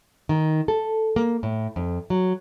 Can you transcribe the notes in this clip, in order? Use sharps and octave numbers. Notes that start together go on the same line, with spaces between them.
D#3
A4
A#3
A2
F2
F#3